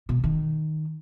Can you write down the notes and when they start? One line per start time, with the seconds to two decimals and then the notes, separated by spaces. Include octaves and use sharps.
0.09 B2
0.24 D#3